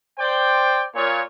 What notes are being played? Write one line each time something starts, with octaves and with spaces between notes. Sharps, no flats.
C5 D5 G5
A#2 C#5